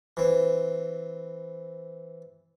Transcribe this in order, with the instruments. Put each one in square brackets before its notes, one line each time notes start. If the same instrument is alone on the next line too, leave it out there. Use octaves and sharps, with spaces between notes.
[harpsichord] E3 C4